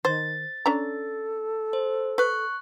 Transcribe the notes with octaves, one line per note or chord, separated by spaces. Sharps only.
D#3 C5 A6
C#4 D4 A4 A#5
C5
B4 C#6 F#6